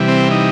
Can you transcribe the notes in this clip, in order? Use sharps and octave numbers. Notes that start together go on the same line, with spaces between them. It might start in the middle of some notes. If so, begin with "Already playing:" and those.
Already playing: C3 E3 G3
C4
D#4